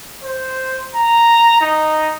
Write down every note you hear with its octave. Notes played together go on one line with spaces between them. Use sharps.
C5
A#5
D#4